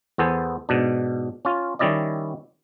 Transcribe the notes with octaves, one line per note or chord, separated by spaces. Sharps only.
E2 B3 A4 C5 G#5
G#2 B2 D4
C#4 F4
D#3 G3 C#4 E4 D5 D#5